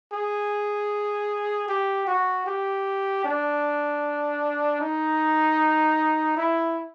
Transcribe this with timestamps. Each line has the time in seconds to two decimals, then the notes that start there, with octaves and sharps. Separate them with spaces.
0.13 G#4
1.69 G4
2.07 F#4
2.47 G4
3.25 D4
4.81 D#4
6.37 E4